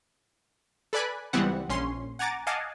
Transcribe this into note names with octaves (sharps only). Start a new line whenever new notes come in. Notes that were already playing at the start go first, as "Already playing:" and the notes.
A4 B4 D5 G#5 B5 F#6
C#2 E3 G3 B3 C4 F#5
A#1 C#4 C6
F#5 G#5 A#5 D6 A6
D#5 F5 F#5 G#5 A5 D6